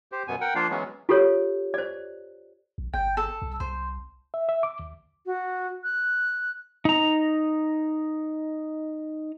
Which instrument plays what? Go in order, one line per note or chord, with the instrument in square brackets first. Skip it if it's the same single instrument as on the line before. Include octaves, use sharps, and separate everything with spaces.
[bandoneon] G4 C5
F#2 B2 B3 G#5
A#4 F#5 G5
F3 A#3 D4 F4 F5
E3 F#3 G#3 B3 C#4
[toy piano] F4 G4 A4 A#4 C#5
C5 D5
[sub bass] A#1
[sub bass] G1 [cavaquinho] G5
[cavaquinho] A4
[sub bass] C2
[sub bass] C2 [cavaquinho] C5
[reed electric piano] E5
E5
D6
D#2
[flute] F#4
F#6
[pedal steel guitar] D#4 A#5